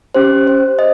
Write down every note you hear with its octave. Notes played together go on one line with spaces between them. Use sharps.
C#4 G4 C5
C5
D#5